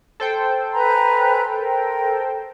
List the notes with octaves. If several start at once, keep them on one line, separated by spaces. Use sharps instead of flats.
A4 C5 G5
B4 G#5 A#5
A#4